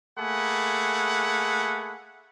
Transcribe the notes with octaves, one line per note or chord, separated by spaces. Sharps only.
A3 A#3 G#4 F#5 G#5 B5